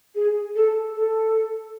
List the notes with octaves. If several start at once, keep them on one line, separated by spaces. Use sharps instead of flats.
G#4
A4
A4